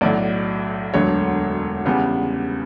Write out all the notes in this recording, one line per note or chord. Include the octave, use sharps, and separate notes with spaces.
B1 A2 F#3 D5
E1 D2 D3 F#3 C#5
E2 C#3 G3 B3